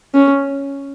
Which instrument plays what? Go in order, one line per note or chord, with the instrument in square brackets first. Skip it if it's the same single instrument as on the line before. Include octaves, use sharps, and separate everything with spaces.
[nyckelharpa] C#4